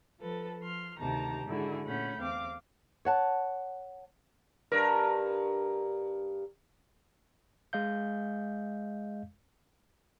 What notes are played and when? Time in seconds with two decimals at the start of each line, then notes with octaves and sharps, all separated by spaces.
0.19 F3 A4 B4
0.59 F3 C6 F6
0.98 D2 C3 D#3 G4 A5 A#5
1.46 G#2 D3 E4 F#4 G#4
1.85 A#2 A3 C#4 F#5 B5 G6
2.19 E2 C4 F5 D6
3.05 C#5 F#5 A5
4.72 G2 A#4
7.73 G#3 D#5 F5 G6